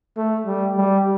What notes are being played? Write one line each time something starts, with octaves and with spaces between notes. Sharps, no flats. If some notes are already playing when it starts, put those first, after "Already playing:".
A3
G3
G3